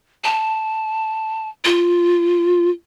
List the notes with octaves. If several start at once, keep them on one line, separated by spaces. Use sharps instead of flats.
A5
F4